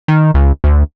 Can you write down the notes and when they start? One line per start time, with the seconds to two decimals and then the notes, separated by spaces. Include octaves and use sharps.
0.08 D#3
0.34 C#2
0.64 D2